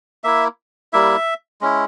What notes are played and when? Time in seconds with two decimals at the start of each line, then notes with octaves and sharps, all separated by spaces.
0.24 A#3 E4 E5
0.93 G3 A#3 E4 E5
1.61 G#3 C#4 E4